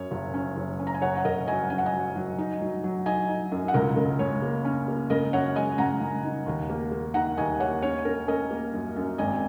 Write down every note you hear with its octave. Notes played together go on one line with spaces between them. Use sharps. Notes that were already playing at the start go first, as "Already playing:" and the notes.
Already playing: F#2 C#4 C#5
F#1
C#4
F#1
C#4
A#5
G#5
F#1 C#5 F#5
F#5
F#1 A#4 D#5
F#3 D#5 G#5
C#4 G#5
F#5
D#5 G#5
F#3
F#3
D#4
F#3
F#3
D#4 D#5 G#5
D#4
F#2
F#5
C#2 A#4 D#5
C#3 A#4
C#3 C#5
A#3
C#4
A#3
C#3 A#4 D#5
F#2 C#5 F#5
G#3 D#5 G#5
C#3 F#5 A#5
C#3
D#4
D#2
A#3
A#3
D#3 F#5 A#5
D#2 D#5 G#5
A#3 C#5 F#5
C#4 C#5
C#4 A#4
C#4 A#4 D#5
A#3
F#2
F#2
G#1 D#5 G#5